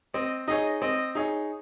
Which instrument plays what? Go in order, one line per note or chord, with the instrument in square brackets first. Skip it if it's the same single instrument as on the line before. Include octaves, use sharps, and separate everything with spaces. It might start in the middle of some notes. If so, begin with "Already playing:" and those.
[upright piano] C4 [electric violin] D#5
[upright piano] D#4 G#4 C#5 [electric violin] D#5
[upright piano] C4 [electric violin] D#5
[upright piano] D#4 G#4 C#5